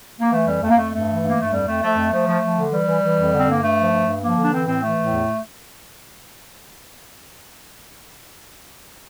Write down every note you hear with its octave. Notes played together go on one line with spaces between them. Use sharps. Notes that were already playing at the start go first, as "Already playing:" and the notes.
A#3
E3 A3
F2 G3
F2 A3
A#3
F2 A3
G2 A3
E3
G2
A#3
G2 A3
F2 G3
F2 A3
F3 A3
F2
F3 A3
F3
F3
D3
E3 G3
E3
E3
F2
D3
C4
G2 A#3
G2 A3
F3
G2
G2
F3 A#3
D3
D4
E3 C4
A2 C4
E3 A3
A2
E2